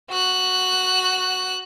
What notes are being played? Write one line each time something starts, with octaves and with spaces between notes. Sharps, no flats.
F#4 F#6